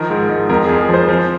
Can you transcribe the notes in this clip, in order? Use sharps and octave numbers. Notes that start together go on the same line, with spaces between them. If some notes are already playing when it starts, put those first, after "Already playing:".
Already playing: D#3 F3 A#4
G#2
G#2
F2 A#4
F2 G#4
G#4
F3 C5
F3